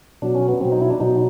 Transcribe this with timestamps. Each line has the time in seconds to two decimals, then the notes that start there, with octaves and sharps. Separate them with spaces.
0.22 B2 F#3 D4
0.35 C#4
0.48 B3
0.61 F#3 C4
0.65 B2
0.72 D#4
0.81 E4
0.91 D4
1.00 B2 F#3 D#4